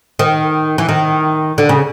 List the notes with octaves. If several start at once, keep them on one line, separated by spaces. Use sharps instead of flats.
D#3
E3
D#3
D3
C#3